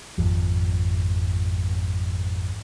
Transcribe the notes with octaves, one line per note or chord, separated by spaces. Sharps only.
G#1 F2 F3